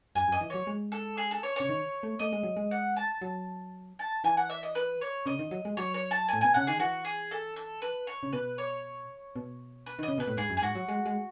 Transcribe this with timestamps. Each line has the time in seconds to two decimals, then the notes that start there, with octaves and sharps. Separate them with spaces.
0.15 F#2 G#5
0.28 F#2
0.32 D#5
0.41 E3
0.50 F#3 C#5
0.67 G#3
0.92 A4
1.17 G#4
1.31 A4
1.43 C#5
1.56 C#3 C#5
1.69 D#3
2.03 A3
2.19 A3 D#5
2.32 G#3
2.43 F#3
2.56 G#3
2.71 F#5
2.96 A5
3.22 F#3
3.99 A5
4.24 E3 G#5
4.37 F#5
4.50 E5
4.63 D#5
4.75 B4
5.01 C#5
5.26 C#3 D#5
5.39 D#3
5.51 F#3
5.65 G#3
5.77 F#3 C#5
5.94 C#5
6.11 A5
6.28 G#5
6.33 A2
6.41 B2 G#5
6.54 C#3 F#5
6.67 D#3 G#4
6.80 E3 F#4
7.05 G#4
7.31 A4
7.56 A4
7.82 B4
8.07 C#5
8.23 C#3
8.33 B2 B4
8.58 C#5
9.36 B2
9.86 B4
9.99 D#3 D#5
10.08 C#3
10.18 B2 B4
10.27 A2
10.37 G#2 G#4
10.50 F#2
10.57 G#4
10.62 G#2 F#4
10.75 F#3
10.88 G#3
11.06 G#3